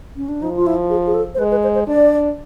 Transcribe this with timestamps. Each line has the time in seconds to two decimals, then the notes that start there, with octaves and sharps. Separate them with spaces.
0.17 C#4
0.29 D4
0.42 F3 D#4
0.57 F4
0.67 E4
0.90 G#4
1.07 G#4
1.14 A4
1.35 C5
1.39 G#3 B4
1.51 B4
1.63 C5
1.75 C5
1.87 D4 D5